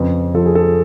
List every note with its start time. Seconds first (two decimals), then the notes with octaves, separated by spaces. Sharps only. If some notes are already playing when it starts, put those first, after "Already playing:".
Already playing: F2 C#3 B4
0.34 F3 A4
0.46 G#4
0.55 A4